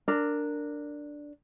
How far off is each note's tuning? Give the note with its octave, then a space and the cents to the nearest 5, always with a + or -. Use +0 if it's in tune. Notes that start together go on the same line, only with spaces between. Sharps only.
D4 +0 A#4 -15